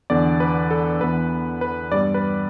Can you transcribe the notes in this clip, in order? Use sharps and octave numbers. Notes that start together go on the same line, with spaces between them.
E2 D3 B3 D5
B4
A4
E2 E3 B3 B4
B4
G2 G3 B3 D5
B4